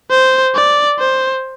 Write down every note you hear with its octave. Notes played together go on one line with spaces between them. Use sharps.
C5
D5
C5